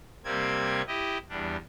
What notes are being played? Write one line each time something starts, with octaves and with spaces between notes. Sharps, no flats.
C3 G3 A#3 C4 G#6
E4 G4 D#5
E2 G3 D4